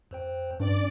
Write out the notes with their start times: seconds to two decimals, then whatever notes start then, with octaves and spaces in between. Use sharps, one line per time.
0.11 F2 C5 G5
0.60 G2 C#4 D5